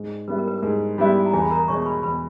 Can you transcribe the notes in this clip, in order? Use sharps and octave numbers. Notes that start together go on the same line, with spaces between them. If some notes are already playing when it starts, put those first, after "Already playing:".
Already playing: G#2
G3 B3 E4 B4
A#4
B4
A#4
G#2 B4
G3 B3 E4
A#5
E2 G#4 G#5
B5
A#4 A#5
B2 G#3 C#5 C#6
C#6
B4 B5
E2 B4 B5